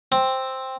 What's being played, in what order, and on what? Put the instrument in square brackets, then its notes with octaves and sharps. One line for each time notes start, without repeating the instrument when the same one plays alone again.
[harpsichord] C4